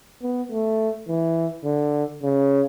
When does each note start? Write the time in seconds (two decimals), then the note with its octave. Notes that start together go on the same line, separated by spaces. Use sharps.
0.23 B3
0.52 A3
1.08 E3
1.65 D3
2.22 C#3